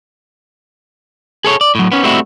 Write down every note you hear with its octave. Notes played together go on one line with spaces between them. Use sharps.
G#4 A4 C#5
D5
A2 F#3
B3 C#4
G3 A3 C4 D#4 E4 F#4